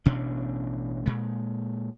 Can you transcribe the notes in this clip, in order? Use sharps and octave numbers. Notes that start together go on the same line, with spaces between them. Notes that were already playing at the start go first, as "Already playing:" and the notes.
A1 B2 C#4 D4
A#2 G#3